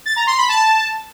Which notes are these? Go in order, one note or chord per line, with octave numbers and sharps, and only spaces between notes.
A6
A#5
C6
B5
A5